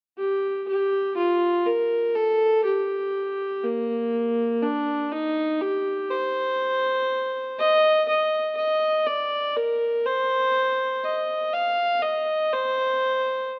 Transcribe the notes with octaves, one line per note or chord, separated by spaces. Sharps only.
G4
G4
F4
A#4
A4
G4
A#3
D4
D#4
G4
C5
D#5
D#5
D#5
D5
A#4
C5
D#5
F5
D#5
C5